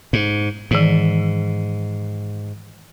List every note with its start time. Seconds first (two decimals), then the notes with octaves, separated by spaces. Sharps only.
0.13 G#2
0.71 G#2 D#3 E3